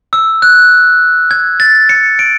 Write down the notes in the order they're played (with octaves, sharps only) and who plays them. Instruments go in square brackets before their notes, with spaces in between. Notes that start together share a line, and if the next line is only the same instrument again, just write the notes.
[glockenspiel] E6
F#6
G#6
A6
C#7
D7